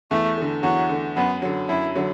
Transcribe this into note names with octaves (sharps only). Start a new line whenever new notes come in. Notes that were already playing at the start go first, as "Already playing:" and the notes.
E2 A3
D3 A3
E2 F#3
D3 A3
F#2 B3
D3 F#3
F#2 E4
D3 F#3